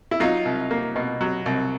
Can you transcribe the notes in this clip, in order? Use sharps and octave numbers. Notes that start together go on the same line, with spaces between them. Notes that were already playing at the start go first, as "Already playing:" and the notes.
E4
F#3 D#4 F4
C2
A#3
B2
F#3
C2